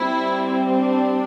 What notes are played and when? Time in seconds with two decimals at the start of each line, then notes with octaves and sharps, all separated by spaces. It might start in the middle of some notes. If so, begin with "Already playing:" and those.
Already playing: G3 C4 E4
0.76 D4